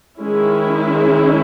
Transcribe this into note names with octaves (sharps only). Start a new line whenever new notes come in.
D#3 G#3 C#4 E4